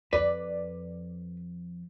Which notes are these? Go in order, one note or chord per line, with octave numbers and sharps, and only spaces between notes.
F2 B4 D5